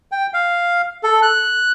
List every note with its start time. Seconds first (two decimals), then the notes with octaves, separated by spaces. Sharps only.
0.12 G5
0.34 F5
1.03 A4
1.22 F#6